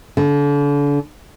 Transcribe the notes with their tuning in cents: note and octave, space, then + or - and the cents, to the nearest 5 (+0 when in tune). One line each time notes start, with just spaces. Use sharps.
D3 -35